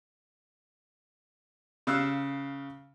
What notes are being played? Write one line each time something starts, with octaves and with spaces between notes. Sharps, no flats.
C#3 F5 E6 F#6